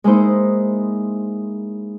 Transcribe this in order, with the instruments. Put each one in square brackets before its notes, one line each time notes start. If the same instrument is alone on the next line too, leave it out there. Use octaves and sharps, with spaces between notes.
[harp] G#3 A#3 D#4 E4 C5